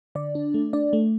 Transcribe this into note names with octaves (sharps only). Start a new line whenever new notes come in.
D3 D5
D4
A3
D4 D5
A3